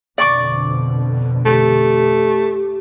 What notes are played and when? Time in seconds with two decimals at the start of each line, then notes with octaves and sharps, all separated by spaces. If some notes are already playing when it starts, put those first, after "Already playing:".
0.18 F2 B2 D3 D5 C#6 D6
1.46 A3 G4